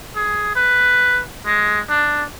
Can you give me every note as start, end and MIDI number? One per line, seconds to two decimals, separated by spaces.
0.16 0.54 68
0.55 1.22 71
1.46 1.80 56
1.90 2.23 62